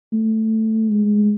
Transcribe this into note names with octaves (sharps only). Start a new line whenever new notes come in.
A3
G#3